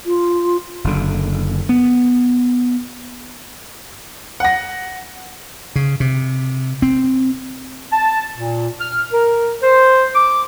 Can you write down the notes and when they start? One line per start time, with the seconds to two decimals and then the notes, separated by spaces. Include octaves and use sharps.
0.06 F4
0.84 F#1 D3
1.69 B3
4.40 F#5 A#6
5.76 C#3
6.00 C3
6.82 C4
7.92 A5
8.37 A#2
8.81 F6
9.12 A#4
9.63 C5
10.15 D6